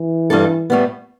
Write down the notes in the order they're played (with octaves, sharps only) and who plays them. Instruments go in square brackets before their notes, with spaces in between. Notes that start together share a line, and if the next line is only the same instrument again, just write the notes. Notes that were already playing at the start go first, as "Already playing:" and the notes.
Already playing: [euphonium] E3
[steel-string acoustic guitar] G2 G3 D4 A4
A2 G3 B3